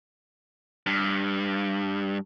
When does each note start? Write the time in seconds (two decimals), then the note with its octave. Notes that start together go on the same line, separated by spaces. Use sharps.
0.87 G2